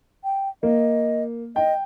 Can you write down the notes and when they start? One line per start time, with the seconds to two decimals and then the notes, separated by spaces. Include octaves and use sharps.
0.24 G5
0.63 A#3 D#5
1.56 D#5 G5